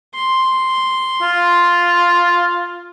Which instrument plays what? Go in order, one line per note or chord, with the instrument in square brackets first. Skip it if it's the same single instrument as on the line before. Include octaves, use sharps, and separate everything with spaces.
[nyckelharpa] C6
[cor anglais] F4